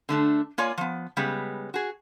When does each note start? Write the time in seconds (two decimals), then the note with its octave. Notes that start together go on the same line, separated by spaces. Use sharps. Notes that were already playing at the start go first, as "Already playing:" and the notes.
0.09 D3 A3 D4
0.58 A#3 F4 C#5 D5 G#5
0.78 F3 B3
1.17 C#3 G3 G#3 B3
1.74 F#4 G#4